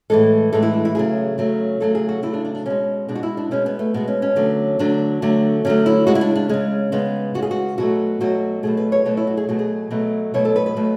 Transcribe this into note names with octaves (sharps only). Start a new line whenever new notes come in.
A2 E3 G#3 A4
A2 E3 G#3 A4
E4
D4
E4
C#3 F#3 A3 G#4
C#3 F#3 A3
C#3 F#3 A3 A4
G#4
F#4
C#3 F#3 A3 E4
D4
D4
D4
B2 G#3 C#4
B2 G#3 D4
F#4
E4
D4
B2 G#3 C#4
B3
A3
B2 G#3 B3
C#4
C#4
D3 F#3 A3
D3 F#3 A3 D4
D3 F#3 A3
D3 F#3 A3 C#4
E4
C#3 G#3 F#4
E4
D4
D4
C#3 G#3 C#4
C#3 G#3 B3
C#3 G#3 F#4
G#4
F#4
B2 F#3 A3 F#4
B2 F#3 A3 F#4
B2 F#3 A3 G#4
B4
C#5
B2 F#3 A3 C#5
E4
F#4
G#4
B2 F#3 A3 F#4
G#4
B2 F#3 A3
B2 F#3 A3 C#5
A4
B4
B4
B2 F#3 A3